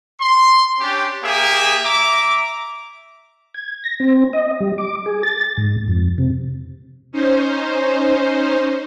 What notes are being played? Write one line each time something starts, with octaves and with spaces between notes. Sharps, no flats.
C6
C#4 D4 G4
A#3 G4 G#4 E5
E5 A#5 D6
G#6
A#6
C4
D#5
G3
D6
G#4
A6
G#2
F2
C3
C#4 D#4 C5